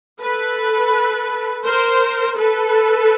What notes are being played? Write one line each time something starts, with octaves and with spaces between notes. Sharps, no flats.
A4 B4
A#4 C5
A4 B4